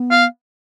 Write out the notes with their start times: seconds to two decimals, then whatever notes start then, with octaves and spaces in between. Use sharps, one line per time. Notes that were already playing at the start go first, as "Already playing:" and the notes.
Already playing: B3
0.11 F5